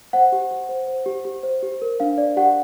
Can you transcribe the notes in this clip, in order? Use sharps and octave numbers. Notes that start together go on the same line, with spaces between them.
C5 F#5
G4
G4
C5
C5
G4
G4
C5
G4
A#4
D4 F5
D5
G4 F#5